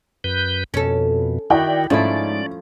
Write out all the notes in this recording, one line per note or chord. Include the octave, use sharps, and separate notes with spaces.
F#2 B4 G6
F2 B2 C#4 A4
D#3 E4 F#4 D5 G5
G#2 F3 A3 C#4 E4 D5